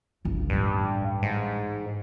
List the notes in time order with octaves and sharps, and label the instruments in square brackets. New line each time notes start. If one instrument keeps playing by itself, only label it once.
[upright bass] G1 C#2
[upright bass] A1 G3 [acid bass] G2
[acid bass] G#2